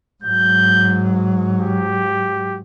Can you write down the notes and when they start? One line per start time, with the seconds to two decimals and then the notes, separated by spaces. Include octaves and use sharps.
0.24 G#2 F#3 G6
1.58 G4